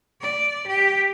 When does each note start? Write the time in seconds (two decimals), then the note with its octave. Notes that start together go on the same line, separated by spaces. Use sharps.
0.21 D5
0.67 G4